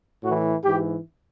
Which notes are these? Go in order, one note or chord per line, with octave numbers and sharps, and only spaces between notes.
A2 E3 F#4
G#2 E3 G4